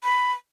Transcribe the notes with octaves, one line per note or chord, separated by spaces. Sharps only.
B5